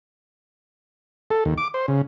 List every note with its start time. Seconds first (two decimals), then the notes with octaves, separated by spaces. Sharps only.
1.31 A4
1.45 D#2
1.58 D6
1.74 C5
1.88 C#3